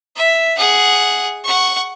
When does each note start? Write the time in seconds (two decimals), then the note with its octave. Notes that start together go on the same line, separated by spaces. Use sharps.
0.16 E5
0.58 G#4 F#5
1.44 F#5 C#6